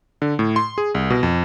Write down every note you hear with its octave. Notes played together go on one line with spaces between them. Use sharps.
D3
A2
C6
G#4
C2
B2
F2